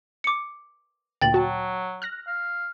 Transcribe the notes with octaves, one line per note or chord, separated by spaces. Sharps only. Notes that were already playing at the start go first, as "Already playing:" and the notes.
D6 C#7
D2 A#2 G5 A6 F#7
F#3 F#4 A5
F6 F#6 A#6
F5